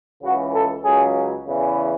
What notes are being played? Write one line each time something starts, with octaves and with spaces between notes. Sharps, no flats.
C#2 C#3 E3 F#4
A4
C#2 C#3 F#3 G#4
E2 C#3 E3